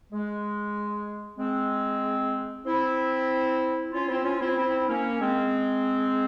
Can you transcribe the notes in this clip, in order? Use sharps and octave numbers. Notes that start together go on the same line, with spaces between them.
G#3
G#3 C4
C4 E4
C#4 F4
C4 E4
C#4 F4
C4 E4
C4 E4
A#3 C#4
G#3 C4